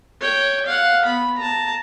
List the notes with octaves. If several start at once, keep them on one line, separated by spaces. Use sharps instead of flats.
C#5 G5
F5 F#5
B3 B5
A5 A#5